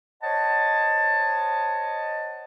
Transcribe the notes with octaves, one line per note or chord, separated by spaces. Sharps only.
C5 C#5 D#5 F#5 A5